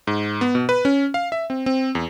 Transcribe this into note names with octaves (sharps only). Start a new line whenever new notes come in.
G#2
B3
B2
B4
C#4
F5
E5
C4
C4
E2